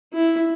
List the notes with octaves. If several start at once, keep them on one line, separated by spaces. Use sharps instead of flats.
E4